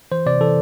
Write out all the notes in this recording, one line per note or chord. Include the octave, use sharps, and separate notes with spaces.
E3 C5
C3 D5
E3 A4